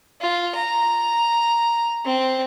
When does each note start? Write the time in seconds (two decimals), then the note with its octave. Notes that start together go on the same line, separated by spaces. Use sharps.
0.21 F4
0.56 A#5
2.05 C4